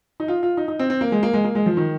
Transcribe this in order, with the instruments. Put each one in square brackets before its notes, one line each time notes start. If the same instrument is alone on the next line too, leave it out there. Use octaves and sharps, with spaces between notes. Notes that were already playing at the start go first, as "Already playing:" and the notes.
[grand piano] D#4
F4
F4
D#4
D#4
C4
C4
A#3
G#3
A#3
G#3
A#3
G#3
F3
D#3